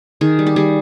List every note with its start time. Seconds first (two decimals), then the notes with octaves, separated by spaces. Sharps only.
0.21 D#3 G#4
0.39 G3
0.47 G4
0.56 G3 G#4